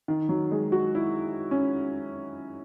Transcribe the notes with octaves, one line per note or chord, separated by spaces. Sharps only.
D#3
F#3
G#3
F#4
E4
C#4